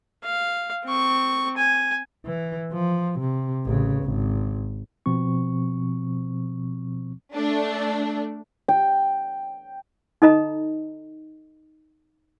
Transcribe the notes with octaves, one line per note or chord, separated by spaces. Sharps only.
F5
C4 C#6
G#5
E3
F3
C3
A1 C#3
G#1
B2 F3 C4 C#6
A3 D4
G5
D#4 A4 D#5 A#5